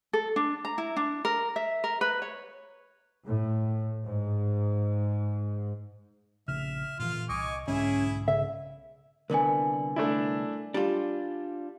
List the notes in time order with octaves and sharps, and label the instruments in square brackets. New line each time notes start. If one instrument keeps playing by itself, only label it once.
[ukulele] A4
D4
A#5
E4
D4
A#4
E5
A#4
B4
C#5
[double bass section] A2
G#2
[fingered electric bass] A#1 C#3 [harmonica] E5 [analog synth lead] F6
[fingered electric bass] A#2 C#3 E3 [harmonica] F4 F5
[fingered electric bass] C2 [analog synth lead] D#5 [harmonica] G#5 C#6 D6
[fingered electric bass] B1 G#2 D3 [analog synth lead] C#4 [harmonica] E4 G#4 E5
[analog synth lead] C#3 [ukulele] E5
[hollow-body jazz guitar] C2 D3 B3 [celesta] A#4 G#5
[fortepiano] A3 D4 E4
[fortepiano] G3 [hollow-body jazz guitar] D4 F4